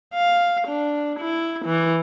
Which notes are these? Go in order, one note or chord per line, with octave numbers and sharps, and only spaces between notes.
F5
D4
E4
E3